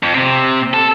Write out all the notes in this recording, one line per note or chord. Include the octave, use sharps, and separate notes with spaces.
F2
C3 C4
A4